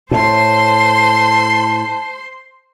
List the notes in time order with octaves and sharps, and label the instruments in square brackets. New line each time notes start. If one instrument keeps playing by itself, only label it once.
[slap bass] A2 [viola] C5 C6 [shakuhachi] A5